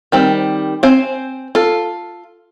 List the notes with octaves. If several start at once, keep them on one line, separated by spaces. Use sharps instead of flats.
D#3 G3 C4
C4 C5 G#5
F4 A4